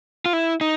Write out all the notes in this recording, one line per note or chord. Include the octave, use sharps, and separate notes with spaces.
F4
E4
D#4